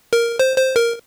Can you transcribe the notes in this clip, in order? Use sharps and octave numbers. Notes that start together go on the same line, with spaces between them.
A#4
C5
C5
A#4